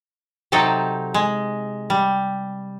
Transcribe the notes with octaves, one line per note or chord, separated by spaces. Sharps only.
C3 F#3 D#4 A4 G5
G#3
G3